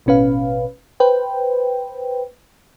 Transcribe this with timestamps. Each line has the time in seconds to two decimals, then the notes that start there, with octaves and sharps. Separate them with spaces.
0.06 A1 B2 C#4 B4 F5
1.00 B4 C5 G5